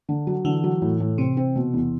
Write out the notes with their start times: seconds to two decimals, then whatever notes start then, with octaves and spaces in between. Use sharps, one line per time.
0.09 D3
0.27 F#3
0.45 D3 E3
0.64 F#3
0.82 A2
1.00 A2
1.18 C3 C4
1.37 C4
1.56 B2
1.74 E2